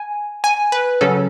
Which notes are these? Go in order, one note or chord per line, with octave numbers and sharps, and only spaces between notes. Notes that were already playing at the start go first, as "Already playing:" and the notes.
Already playing: G#5
G#5
B4
C#3 F#3 C#4 A4